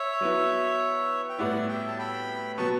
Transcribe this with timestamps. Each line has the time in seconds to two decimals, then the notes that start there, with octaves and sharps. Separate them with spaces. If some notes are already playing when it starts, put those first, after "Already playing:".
Already playing: C#5 E5
0.21 F#3 B3 E4
1.29 G5
1.39 A2 G3 B3 E4 D5 F#5
1.69 E5 G5
1.87 A5
1.98 G5 B5
2.58 B2 F#3 B3 A5 C#6